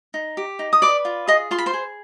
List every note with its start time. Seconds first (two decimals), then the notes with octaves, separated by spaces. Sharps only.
0.14 D#4
0.37 G4
0.59 D#4
0.73 D#6
0.82 B4 D5 D6
1.05 F4
1.27 G#4 D#5 D#6
1.51 F4 C6
1.58 B5
1.66 C5 C6
1.73 G#4